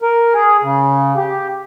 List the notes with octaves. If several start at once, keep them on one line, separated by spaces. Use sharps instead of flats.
A#4
G#4
C#3
G4